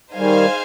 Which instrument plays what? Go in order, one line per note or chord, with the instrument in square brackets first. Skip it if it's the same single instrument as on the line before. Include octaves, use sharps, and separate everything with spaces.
[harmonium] D#3 G3 [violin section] D#4 G#4 C5 F5 G#5